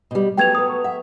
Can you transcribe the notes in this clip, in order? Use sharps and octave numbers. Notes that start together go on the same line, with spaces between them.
B2 G3
F#3 A3 B3 G5 G#6 F7
B4 D#6
C#6
E5 F#5